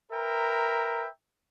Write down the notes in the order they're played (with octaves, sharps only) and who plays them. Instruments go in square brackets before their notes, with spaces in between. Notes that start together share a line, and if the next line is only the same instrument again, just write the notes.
[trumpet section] A#4 B4 E5 G5 A#5